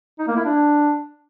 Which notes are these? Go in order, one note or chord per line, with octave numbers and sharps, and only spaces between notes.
D#4
A#3
E4
D4